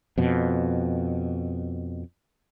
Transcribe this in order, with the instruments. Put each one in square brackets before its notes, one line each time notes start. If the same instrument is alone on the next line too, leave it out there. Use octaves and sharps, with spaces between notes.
[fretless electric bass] F2 B2